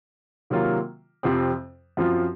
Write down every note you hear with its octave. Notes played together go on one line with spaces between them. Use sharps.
C3 D#3 F#3 A#3 F4
F2 C3 F3 C4
F#2 F3 C4 F4